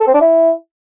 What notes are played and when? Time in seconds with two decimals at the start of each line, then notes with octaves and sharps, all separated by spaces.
0.01 A4
0.07 C4
0.14 D4
0.21 E4